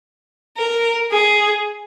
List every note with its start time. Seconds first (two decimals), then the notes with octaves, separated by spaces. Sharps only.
0.58 A#4
1.11 G#4